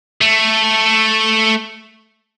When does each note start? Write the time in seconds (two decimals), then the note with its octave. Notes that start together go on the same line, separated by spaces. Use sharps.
0.21 A3